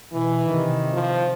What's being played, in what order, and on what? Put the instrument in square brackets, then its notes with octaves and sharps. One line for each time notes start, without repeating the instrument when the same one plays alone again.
[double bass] B2 [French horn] E3
[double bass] C3 D#3
[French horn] F3